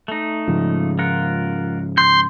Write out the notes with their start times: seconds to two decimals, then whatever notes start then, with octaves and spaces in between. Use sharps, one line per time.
0.08 A3 D#4
0.48 G#2 C#3 F3
0.99 F4 A#4 F#5
1.98 C6 G6